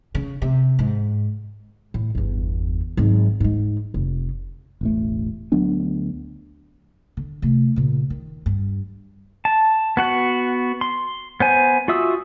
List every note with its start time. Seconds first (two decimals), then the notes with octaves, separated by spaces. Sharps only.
0.15 C#3
0.42 C3
0.79 G#2
1.94 A2
2.15 G1 E2
2.97 G#1 F#3
3.40 G#2 G#3
3.94 F1
4.81 E1 A1 A3
5.52 D2 F#3 B3 D4
7.17 D3
7.42 C3 A3
7.76 A#2 C#3
8.10 D#3
8.46 G2
9.45 A5
9.97 B3 F#4 F#5
10.81 C6
11.40 B3 C5 G#5
11.88 F4 F#4 E5 D#6 E6